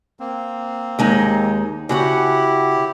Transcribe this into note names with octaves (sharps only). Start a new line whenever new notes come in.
A#3 C4
D#2 G#3 D#4
C#3 E4 F#4 G4 F#5